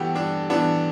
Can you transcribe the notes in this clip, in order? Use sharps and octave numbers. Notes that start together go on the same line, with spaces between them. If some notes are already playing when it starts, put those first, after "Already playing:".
Already playing: G2 E3 B3 F#4 G4 A4
G2 D4
E3 B3 D4